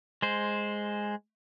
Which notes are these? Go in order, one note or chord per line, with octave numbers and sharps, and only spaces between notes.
G#3 C5